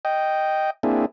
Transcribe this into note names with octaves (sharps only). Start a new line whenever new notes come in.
D#5 G5
A#3 C4 D4 E4 G#4